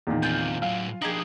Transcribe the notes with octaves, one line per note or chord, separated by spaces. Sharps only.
E2 A#2 D#3
D2 C4 F4 G#5 G6
A2 F#3 F5
F3 D4 D#4 G4 G#4